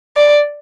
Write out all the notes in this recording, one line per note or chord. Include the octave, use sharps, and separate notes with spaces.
D5